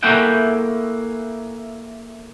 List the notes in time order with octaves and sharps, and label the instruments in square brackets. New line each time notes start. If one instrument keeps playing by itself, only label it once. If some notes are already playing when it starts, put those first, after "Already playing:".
[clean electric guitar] A3 A#3 E4 G#4 F#5 G5